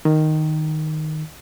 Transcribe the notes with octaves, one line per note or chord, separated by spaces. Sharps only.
D#3